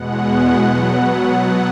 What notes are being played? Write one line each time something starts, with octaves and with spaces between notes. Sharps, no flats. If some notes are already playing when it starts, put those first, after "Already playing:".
Already playing: E2 B2 G#3 B3 F#5
B2 F#3 B3 F#5